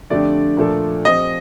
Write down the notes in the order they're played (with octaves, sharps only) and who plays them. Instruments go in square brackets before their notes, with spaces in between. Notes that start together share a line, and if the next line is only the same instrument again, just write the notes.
[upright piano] F2 D3 A3 D4 G4 [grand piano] D5
[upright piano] A#2 F3 A3 D4 A4
[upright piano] F3 C4 G4 C5 [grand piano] D#5